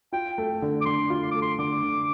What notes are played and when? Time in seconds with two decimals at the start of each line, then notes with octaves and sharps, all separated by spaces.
0.13 F4 G5
0.38 A3
0.62 D3
0.81 D6
0.85 D3 C6
1.10 F4
1.23 C6
1.31 A3 D6
1.42 C6
1.59 D3 D6
1.83 D3